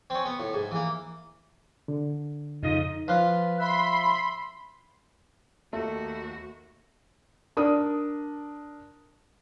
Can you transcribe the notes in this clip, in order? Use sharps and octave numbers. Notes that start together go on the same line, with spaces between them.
C4 C#4
B3
A2
G#2
E3 A#3
D3
F2 C#3 D#4 F4 D#5
F3 F4 B4
E5 B5 C6
D#2 A3 F#4
D4 A#4 D#6